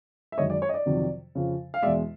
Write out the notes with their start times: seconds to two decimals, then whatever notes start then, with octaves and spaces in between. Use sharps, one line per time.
0.32 E5
0.38 F#2 D#3 G#3 C#5 D#5
0.50 D5
0.62 C#5
0.69 D#5
0.74 D5
0.86 F2 C3 D#3 F#3
1.35 F2 C#3 F3
1.74 F5
1.82 E2 B2 G#3 D5 E5